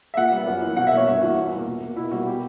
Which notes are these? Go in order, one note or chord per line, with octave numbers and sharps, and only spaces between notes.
E5
A#2 F#5
G3
B3
F#2
E3 A#3
B2 F#5
E5
A#3 C#5
G2 E5
E3 A#3 F#4
E2
B2 A#3
A#2
A#3
B2 E4
G3 A#3 F#4
B2 G4